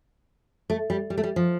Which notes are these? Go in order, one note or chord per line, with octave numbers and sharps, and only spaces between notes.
A3
G3
G3
A3
G3
F3